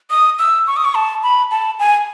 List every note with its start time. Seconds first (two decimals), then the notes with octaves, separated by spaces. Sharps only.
0.10 D#6
0.39 E6
0.67 C#6
0.77 D#6
0.85 C#6
0.95 A5
1.23 B5
1.51 A5
1.79 G#5